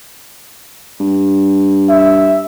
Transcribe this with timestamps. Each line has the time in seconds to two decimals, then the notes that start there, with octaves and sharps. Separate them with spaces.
1.00 G2
1.89 E5